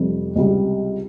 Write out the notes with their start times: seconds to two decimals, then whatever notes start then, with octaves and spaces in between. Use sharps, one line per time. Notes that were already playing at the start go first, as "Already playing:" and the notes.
Already playing: F1 F2 C3 G3 C4
0.36 C#2 C3 G3